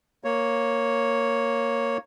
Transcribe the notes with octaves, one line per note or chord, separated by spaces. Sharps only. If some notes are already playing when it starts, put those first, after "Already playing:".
A#3 C#5